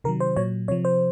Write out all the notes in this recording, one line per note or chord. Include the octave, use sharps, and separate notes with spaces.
C3 D#3 F#3 A#4
C5
A#2 F#3 C#5
C3 F3 C#5
C5